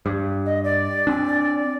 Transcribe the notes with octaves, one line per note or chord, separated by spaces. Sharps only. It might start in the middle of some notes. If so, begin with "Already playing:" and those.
G2
D#5
D5
C4 D4